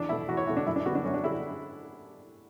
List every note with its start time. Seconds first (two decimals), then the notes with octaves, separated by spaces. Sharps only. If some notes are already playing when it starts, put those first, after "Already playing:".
Already playing: E2 D4
0.09 B2 A3 E4
0.28 E2 F#4
0.37 C#5
0.47 B2 A3 E4
0.57 D4
0.67 F#2 E4
0.76 D4
0.85 D3 G3 B3 F#4
0.95 D4
1.05 F#2 C#4
1.14 D4
1.24 D3 G3 E4